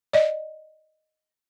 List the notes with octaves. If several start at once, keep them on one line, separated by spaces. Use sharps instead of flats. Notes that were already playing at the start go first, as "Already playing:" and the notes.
D5 D#5